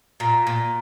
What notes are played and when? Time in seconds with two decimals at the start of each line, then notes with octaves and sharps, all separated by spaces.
0.20 A#2
0.47 A#2